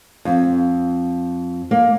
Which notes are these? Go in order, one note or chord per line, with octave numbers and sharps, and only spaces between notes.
F2
A#3